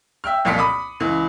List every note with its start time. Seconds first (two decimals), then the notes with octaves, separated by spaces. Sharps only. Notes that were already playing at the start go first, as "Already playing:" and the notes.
0.24 E5 G5 F6
0.45 C2 F2 A#2 F5 B6 C#7
0.58 B5 D6 D#6
1.00 C#2 E3